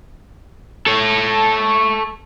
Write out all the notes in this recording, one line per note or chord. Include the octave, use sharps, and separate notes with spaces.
A4 C#5